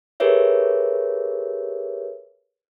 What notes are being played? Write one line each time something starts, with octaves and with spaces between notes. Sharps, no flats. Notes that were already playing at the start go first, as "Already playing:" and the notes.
G4 G#4 A#4 B4 C#5 E5